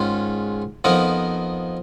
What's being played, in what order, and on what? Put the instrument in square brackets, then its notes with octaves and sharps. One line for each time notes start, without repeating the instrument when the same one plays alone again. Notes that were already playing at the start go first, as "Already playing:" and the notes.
Already playing: [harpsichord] G#2 D#3 G#3 C#4 F4
F2 F3 B3 D#4 A#4